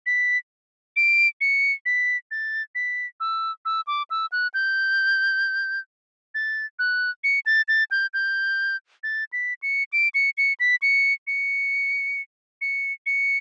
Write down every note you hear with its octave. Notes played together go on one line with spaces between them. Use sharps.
B6
D7
C#7
B6
A6
B6
E6
E6
D6
E6
F#6
G6
A6
F#6
C#7
A6
A6
G6
G6
A6
B6
C#7
D7
C#7
C#7
B6
C#7
C#7
C#7
C#7